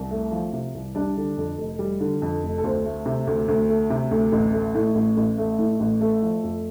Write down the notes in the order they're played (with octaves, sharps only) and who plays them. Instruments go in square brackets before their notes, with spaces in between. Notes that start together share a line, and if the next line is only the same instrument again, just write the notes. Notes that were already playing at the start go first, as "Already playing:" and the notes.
Already playing: [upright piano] C2
A3
F3
C3
C2
G3 D4 D5
D3
F2
F1
G3
D3
F2
F1
A4
D2 C4 C5
A3
C3
D2
D2
A3
C3
D2
A1
A3
A2
A1
A1
A3
A2
A1
A3 A4
F3
F2